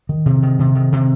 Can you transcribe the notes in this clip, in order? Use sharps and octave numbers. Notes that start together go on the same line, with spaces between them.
D#3
C3
D#3
C3
D#3
C3